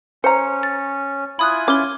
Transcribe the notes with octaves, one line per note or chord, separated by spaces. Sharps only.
C#4 C5 A#5 C#7
A6
E4 F4 G#5 B5 D#6 F#6
C#4 D6 F6 G7